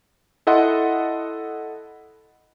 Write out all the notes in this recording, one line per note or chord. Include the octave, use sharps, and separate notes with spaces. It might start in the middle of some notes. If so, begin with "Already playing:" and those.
E4 A4 D#5 F#5 C6